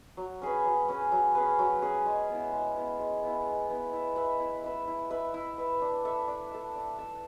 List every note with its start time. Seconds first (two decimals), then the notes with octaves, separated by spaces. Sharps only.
0.17 F#3
0.41 C#4 G#4 B4
0.65 F#3
0.89 C#4 G#4 B4
1.12 F#3
1.35 C#4 G#4 B4
1.59 F#3
1.82 C#4 G#4 B4
2.06 G#3
2.29 B3 E4
2.52 G#3
2.76 B3 E4
3.00 G#3
3.23 B3 E4
3.46 G#3
3.70 B3 E4
3.93 E4
4.16 B4 E5
4.40 E4
4.64 B4 E5
4.87 E4
5.11 B4 E5
5.34 E4
5.58 B4 E5
5.81 D4
6.05 A4 E5
6.28 D4
6.51 A4 E5
6.75 D4
6.98 A4 E5